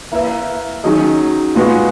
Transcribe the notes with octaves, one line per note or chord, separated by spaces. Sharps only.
A#3 E4 B4 E5
D#3 F#3 C#4 G#4 D#5
A#2 G#3 B3 F#4